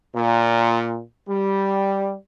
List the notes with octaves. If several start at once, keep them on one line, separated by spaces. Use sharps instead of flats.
A#2
G3